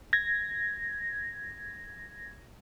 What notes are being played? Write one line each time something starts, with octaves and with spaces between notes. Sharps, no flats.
G#6 A#6